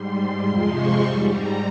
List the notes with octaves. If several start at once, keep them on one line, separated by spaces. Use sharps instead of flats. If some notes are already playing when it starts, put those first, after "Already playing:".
Already playing: G#2 G3 C6
C6
F2 C3 F3 G#3 C6
C#6
G#2 G3
A#5